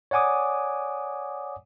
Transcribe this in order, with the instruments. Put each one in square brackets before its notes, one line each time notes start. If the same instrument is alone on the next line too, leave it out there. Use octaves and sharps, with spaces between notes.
[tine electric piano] C#5 D5 F#5 G#5 D6 D#6